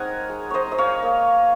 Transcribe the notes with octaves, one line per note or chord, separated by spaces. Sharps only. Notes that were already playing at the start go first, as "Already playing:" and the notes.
Already playing: G#3 C4 D#4 A#4 C#5 D#5 F#5 G#5
G#3
C5 C#5 D#5
D#4 D#5
C#5 F5
A#3